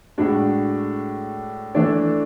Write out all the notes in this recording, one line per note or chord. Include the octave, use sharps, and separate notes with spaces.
A2 G#3 D4 F#4
E3 A3 D4 A4 D5